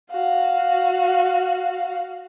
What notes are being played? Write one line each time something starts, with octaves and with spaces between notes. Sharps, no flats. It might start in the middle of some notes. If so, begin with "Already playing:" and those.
F#4 F5